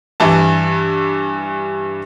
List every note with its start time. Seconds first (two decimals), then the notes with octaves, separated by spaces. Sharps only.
0.20 G2 E3 E4 A5